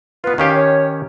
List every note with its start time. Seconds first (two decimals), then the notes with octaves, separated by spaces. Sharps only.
0.24 B3 F4 B4
0.38 D#3 C#4 G4 F5
0.54 C#5